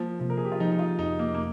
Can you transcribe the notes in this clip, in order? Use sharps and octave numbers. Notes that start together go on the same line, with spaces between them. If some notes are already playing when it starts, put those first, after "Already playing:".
Already playing: F3 A#3
C3 F3
A#4
G#4
G4
F4
F3 D#4
D#4
F4
F2 D#4
A#3
A#3